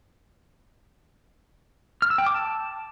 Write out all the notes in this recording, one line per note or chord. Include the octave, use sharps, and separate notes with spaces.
F6
E6
G5
D6
A5